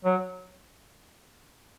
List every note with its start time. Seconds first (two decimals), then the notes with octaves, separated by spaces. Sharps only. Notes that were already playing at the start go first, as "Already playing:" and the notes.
0.05 F#3